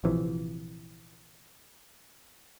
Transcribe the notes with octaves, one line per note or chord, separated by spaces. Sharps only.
A#1 C3 E3 F3